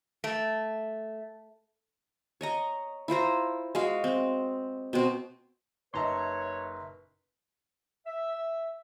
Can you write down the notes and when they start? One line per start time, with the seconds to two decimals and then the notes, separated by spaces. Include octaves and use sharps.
0.24 A3
2.41 C#5 D#5 A#5
3.08 E4 F4 C5 A#5
3.75 G#3 F#4 F5
4.04 C4
4.93 B2 C4
5.94 F#1 D#4 B4 C#5 E5 A5 A#5 C6
8.06 E5